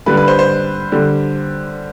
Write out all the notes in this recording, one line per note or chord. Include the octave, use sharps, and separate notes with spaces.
D3 G3 B4
B4
C5
C5
D3 G3